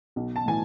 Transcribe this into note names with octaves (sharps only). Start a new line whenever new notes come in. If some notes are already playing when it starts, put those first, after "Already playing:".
B1
A5
A2 E3 G#5